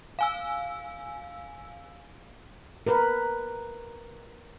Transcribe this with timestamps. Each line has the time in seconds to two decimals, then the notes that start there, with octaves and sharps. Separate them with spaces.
0.19 F5 G#5 E6
2.87 A#4 B4